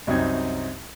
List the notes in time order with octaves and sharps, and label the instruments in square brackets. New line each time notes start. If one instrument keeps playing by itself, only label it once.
[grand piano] C2 F#2 F#3 C4 D#4 G#6